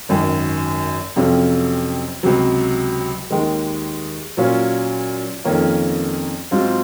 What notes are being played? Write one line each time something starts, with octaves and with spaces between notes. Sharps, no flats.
G#1 F#2 D#3
F2 C3 F#3 C#4 F4
C#2 C3 F#3
D#2 D#3 G#3
A#2 F#3 C#4 F4
F2 D#3 A#3 C#4 F4
G#2 F#3 C4 F4